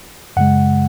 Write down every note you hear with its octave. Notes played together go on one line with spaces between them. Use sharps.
F#2 C#3 G#3 F#5